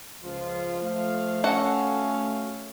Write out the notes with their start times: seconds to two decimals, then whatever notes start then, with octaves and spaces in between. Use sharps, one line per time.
0.23 C#2 F3 F4
0.82 A3 F5
1.44 C#4 F#4 A4 F#5